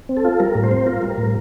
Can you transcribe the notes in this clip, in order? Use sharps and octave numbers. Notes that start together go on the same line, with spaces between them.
C4
A4
F4
G3 A#4
A2
C5
C4
F4 A#4
G3
A#4
A2